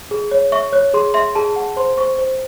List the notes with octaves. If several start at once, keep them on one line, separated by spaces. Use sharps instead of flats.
G#4
C#5
E5 C#6
C#5 F#6
G#4 C6
E5 C6
G#4 A5
F#5 A5
C5 C6
C5 C#6
C5